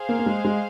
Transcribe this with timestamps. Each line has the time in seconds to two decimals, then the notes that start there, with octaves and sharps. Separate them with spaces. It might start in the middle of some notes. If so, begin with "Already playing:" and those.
Already playing: G#4 C5 F5
0.09 A#3
0.19 A#3
0.26 G#3
0.45 G#3